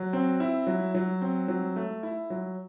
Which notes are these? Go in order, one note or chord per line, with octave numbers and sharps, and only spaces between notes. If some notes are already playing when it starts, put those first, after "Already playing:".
Already playing: F#3
C4
E4
F#3
F#3
C4
F#3
A3
E4
F#3